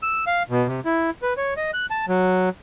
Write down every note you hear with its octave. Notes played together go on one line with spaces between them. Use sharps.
E6
F5
B2
C3
E4
B4
C#5
D#5
F#6
A5
F#3